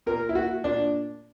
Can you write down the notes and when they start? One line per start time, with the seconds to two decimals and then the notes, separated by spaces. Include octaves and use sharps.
0.06 A#2 A#4
0.29 E4
0.35 F#4
0.64 A#2 D4